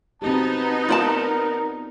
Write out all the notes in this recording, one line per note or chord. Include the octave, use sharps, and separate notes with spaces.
B3 C4 D#4 F#4 G4 A5
F4 A#4 D5 A5